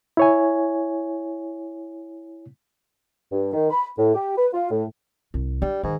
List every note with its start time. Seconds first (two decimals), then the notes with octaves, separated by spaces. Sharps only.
0.17 E4 C#5 G#5
3.32 G2
3.53 D#3
3.70 B5
3.97 A2
4.15 G4
4.36 B4
4.53 F4
4.71 A2
5.34 C2
5.62 G3 D4
5.83 G#2 D#3